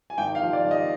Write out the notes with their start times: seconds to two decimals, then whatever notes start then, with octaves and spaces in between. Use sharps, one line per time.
0.10 G#5
0.18 G#1 G5
0.35 F5
0.41 F3
0.53 D5
0.65 G#1
0.71 D#5